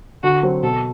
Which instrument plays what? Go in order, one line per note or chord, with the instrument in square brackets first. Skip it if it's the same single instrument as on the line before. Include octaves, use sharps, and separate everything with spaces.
[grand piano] D3 [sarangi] F#4
[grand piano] F#3 C4
[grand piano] B2 [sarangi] A4